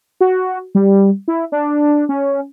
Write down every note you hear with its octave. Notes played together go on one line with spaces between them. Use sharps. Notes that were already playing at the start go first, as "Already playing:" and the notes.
F#4
G3
E4
D4
C#4